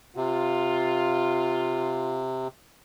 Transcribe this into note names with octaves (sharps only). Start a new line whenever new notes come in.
C3 F4